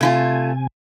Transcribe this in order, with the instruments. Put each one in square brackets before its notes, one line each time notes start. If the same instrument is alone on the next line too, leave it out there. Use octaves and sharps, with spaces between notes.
[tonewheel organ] C3 G#5 [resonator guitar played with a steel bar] A3 E4 F4